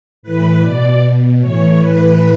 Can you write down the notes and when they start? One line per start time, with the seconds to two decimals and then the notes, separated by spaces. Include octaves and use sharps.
0.23 A2 E3 B4
0.61 B2 D5
1.01 B2
1.40 A2 E3 C#5
1.79 A2 E3 B4